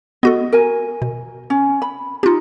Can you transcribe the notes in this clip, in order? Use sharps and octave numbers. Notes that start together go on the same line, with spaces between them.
B3 F#4 A4 D#5
A#4 G#5
B2
C#4
B5
D4 D#4 F4 G4